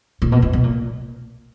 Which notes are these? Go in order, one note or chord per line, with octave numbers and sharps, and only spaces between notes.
A#2
B2
A#2
B2
A#2